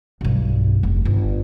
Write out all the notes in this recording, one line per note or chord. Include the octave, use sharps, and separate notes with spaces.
B1 G2
F1
G1